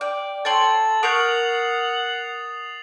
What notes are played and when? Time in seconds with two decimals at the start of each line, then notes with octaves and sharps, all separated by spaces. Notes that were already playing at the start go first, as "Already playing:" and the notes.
0.01 D5 G5
0.45 A4 C#5 G5 C6 A6 F#7
1.03 A#4 F#5 C#6 D#6 G6 C7 F7